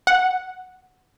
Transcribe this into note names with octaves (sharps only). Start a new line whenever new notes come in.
F#5